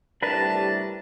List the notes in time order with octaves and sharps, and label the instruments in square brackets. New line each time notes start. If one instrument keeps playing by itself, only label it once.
[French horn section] A2 C3 G3 [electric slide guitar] D4 A#4 B4 [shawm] A5